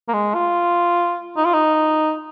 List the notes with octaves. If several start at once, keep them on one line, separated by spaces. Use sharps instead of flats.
A#3
G#3
F4
D#4
F4
D#4